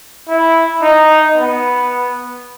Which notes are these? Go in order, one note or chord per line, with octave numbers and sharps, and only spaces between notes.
E4
D#4
B3